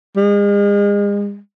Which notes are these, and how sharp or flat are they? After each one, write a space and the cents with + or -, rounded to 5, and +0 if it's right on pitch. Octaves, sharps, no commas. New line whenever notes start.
G#3 -40